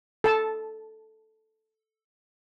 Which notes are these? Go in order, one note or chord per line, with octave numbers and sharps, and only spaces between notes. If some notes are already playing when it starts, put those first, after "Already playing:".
A4 A5